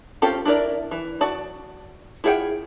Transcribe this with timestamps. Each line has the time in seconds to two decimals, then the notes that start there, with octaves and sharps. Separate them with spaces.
0.22 C4 C#4 F4 G4 A4
0.45 D4 E4 A#4 D5
0.91 E3
1.21 F#4 D5 A5
2.24 E4 F4 G#4 F#5 G5